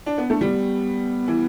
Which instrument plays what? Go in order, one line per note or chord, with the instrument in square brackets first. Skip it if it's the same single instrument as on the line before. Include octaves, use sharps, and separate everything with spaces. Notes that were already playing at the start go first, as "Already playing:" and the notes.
[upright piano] D4
B3
[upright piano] A3 [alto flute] D4
[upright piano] G3 [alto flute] B3
[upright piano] E3